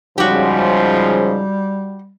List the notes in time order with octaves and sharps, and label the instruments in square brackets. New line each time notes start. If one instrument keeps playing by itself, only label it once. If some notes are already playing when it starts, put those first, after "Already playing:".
[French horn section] G#2 C#3 F3 [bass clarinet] G3 [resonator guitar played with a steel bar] F#4 G4